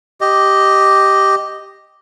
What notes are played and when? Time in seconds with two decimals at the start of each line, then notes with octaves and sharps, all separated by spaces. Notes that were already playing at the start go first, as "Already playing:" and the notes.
0.21 G4 D#5